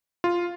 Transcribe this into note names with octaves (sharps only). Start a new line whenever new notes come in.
F4